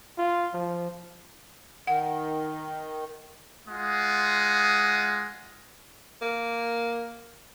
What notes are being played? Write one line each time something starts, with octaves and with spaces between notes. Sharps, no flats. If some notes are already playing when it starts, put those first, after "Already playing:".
F4
F3
D#3 F#5
G#3 F4 F#5 D#6
A#3